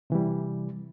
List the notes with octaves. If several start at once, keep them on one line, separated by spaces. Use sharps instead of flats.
C3 E3 G3